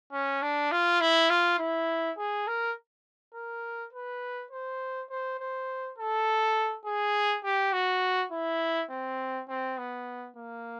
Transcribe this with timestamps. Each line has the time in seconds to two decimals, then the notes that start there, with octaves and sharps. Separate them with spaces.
0.12 C#4
0.42 D4
0.71 F4
1.01 E4
1.29 F4
1.59 E4
2.18 G#4
2.47 A#4
3.34 A#4
3.93 B4
4.51 C5
5.09 C5
5.40 C5
5.98 A4
6.85 G#4
7.44 G4
7.73 F#4
8.31 E4
8.90 C4
9.48 C4
9.78 B3
10.36 A#3